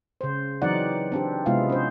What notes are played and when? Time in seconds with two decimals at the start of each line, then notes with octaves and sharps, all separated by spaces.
0.21 C#3 C5
0.62 E3 F#3 C4 D#4 D5 F#5
1.12 C4 D4 G4
1.46 C3 G#3 B3 E4 F4 F5
1.70 C#4 C5